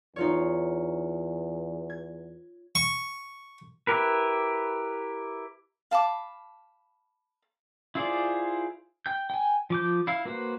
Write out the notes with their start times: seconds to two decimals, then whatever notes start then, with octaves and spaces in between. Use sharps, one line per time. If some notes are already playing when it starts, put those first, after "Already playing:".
0.16 E2 D#4 F4 C#5
1.90 G#6
2.75 C#6
3.87 E4 G4 A#4 B4
5.91 F5 A5 B5 D6
7.95 E4 F4 G#4 C5 D5
9.06 G5 G6
9.30 G5 G#5
9.70 F3 D6 G6
10.07 E4 F5
10.25 A#3 F#4 B4 C5